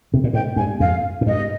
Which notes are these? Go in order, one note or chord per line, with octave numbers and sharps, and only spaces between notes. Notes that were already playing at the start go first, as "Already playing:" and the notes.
C3
A#2
G#2 G5
G2 G#5
F2 F5
G#2
G2 D#5